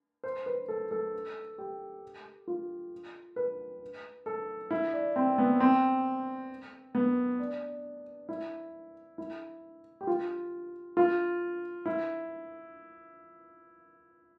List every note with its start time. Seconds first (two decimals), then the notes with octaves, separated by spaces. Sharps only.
0.24 C5
0.46 B4
0.68 A4
0.91 A4
1.58 G4
2.48 F4
3.36 B4
4.26 A4
4.71 E4
4.93 D4
5.16 C4
5.38 B3
5.60 C4
6.95 B3
7.39 D4
8.29 E4
9.18 E4
10.01 G4
10.07 F4
10.97 F4
11.86 E4